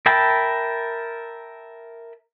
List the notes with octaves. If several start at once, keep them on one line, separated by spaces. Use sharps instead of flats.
A#4 E5 G5 A5 B5